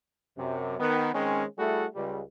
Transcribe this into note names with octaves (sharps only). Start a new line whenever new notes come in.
F#2 C3
D#3 B3
D#3 G#3 C4 C#4
G3 A3 E4 F#4 G#4 A4
C#2 G3